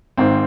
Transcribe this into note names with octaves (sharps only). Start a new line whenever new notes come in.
G#1 G#2 D#3 C4